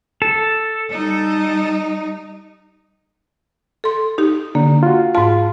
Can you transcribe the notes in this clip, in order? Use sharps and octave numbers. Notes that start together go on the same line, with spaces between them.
A4
G3 D#4
A4 C6
D#4 G4
D3 A#3 D4
F4 F#4
G#2 F4 A5